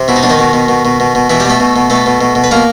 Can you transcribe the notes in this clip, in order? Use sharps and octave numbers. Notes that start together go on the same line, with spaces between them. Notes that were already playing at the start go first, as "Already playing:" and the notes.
Already playing: C3
B2 E4
D#4
B2 D4
D#3 D#4
B2
B2
B2
B2
B2
B2
B2 E3 E4
G3 G4
B2 A3 A4
B2
B2
B2 A3 A4
B2
B2
B2
B4
B2 A#3 A#4